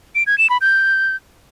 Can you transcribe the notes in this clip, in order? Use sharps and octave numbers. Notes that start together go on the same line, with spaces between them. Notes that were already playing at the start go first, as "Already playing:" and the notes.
D7
G#6
E7
B5
G6